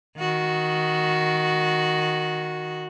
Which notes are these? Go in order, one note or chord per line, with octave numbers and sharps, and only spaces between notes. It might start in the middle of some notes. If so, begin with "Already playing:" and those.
D#3 F#4